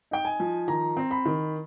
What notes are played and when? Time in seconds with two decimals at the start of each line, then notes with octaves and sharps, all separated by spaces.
0.11 D#4 G5
0.25 G#5
0.40 F3
0.68 D#3 A#5
0.97 C4
1.11 B5
1.25 D#3